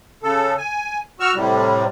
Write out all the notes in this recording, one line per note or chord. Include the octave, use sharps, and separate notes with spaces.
C#3 A4
G#5
F#4 C#6 E6 F6
A2 C3 G3